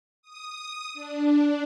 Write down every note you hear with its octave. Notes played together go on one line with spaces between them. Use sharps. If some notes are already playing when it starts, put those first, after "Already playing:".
D#6
D4